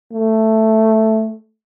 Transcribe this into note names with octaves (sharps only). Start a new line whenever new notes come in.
A3